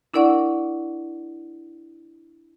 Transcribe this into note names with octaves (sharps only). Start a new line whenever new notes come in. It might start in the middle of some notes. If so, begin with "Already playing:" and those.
D4 E4 A#4 D5 F#5 C#6